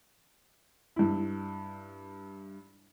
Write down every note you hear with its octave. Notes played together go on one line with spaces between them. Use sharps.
G2 E4